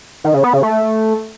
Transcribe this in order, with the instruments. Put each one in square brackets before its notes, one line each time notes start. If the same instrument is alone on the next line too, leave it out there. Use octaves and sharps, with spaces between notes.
[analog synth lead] D#3
C#3
B3
C#3
A3